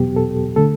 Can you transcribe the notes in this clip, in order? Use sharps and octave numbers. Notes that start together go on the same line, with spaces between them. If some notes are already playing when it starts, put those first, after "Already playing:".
Already playing: E2 B2 F#3 B3 G4
A4
D3 A3 A4